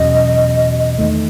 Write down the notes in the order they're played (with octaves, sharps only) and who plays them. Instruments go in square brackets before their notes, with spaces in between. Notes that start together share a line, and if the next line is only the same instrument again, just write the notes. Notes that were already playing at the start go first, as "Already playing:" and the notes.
Already playing: [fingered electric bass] E2 B2 F#3 C#4 [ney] D#5
[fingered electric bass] E2 D#3 A3